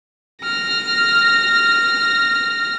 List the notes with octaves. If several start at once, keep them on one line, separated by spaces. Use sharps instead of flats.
F6 A#6